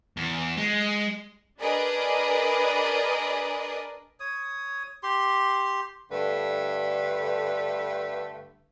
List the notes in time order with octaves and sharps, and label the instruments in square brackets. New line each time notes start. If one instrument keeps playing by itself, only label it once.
[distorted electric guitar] E2
G#3
[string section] D4 G#4 A#4 B4 D5 D#5
[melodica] C#5 D#6
G4 C6
[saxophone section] G2 D3 A3 B4